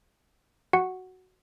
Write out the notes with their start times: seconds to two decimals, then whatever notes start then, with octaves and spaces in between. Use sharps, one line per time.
0.73 F#4 F#5